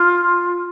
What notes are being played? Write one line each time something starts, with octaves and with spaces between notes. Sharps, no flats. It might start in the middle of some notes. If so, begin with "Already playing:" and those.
Already playing: F4